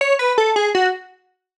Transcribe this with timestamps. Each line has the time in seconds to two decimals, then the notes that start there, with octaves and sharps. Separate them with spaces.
0.01 C#5
0.19 B4
0.38 A4
0.56 G#4
0.75 F#4